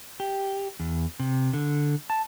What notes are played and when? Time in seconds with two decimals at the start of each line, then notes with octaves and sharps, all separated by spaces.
0.20 G4
0.80 E2
1.20 C3
1.53 D3
2.10 A5